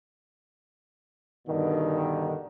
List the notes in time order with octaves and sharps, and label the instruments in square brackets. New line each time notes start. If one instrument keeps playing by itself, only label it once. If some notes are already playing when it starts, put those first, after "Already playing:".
[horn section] G2 B2 D3 D#3